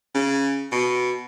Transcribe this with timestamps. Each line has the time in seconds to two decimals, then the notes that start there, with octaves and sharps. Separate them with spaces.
0.14 C#3
0.72 B2